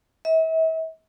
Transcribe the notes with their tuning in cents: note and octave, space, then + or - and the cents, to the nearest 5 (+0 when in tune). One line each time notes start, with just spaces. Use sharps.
E5 -40